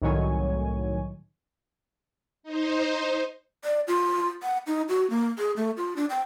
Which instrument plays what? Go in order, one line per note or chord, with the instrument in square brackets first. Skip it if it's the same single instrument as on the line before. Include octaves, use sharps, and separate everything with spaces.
[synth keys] C2 A2 D#3 F#3 C#5 G#5
[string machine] D#4 C5
[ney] D5
F4
F#5
D#4
F#4
A#3
G#4
A3
F4
D4
G5